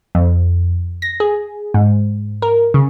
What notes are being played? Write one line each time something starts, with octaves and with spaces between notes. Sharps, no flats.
F2
A#6
G#4
G#2
A#4
C#3